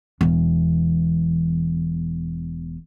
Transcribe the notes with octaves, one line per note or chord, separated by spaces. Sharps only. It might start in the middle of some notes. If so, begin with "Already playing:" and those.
E1 E2